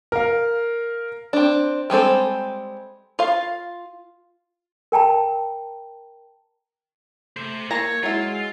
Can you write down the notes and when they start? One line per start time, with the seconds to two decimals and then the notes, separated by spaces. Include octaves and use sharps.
0.12 A#4 F5
1.33 C4 D4
1.90 G3 G#3 C4 A4
3.19 F4 F5
4.92 A#4 G5 A5 A#5
7.36 A3 C5 E5
7.71 A#3 A4 C#5 A5 A#5
8.03 F#3 G#3 E4 F4